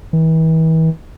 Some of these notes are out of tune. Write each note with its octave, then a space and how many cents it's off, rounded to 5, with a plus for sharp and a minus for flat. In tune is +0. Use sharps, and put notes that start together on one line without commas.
E3 -40